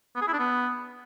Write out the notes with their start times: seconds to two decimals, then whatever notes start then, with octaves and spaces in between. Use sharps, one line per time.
0.15 B3
0.21 G#4
0.27 E4
0.33 D4
0.39 B3